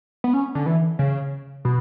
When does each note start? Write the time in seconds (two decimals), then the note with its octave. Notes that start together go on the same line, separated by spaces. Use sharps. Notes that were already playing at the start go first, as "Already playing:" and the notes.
0.24 B3
0.34 C#4
0.55 D3
0.66 E3
0.99 C#3
1.65 B2